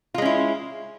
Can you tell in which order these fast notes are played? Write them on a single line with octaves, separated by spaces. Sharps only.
F4 G#3 C#4 E4